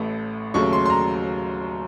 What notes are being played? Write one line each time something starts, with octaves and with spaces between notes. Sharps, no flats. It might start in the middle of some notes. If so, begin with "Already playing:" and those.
Already playing: A1 A2 A3
D#2 C#3 F#3 A3 C#6
C6
C6
A#5